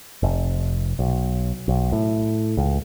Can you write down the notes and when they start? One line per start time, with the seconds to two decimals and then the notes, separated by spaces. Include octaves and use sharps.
0.23 F1
0.99 B1
1.68 B1
1.92 A2
2.57 C#2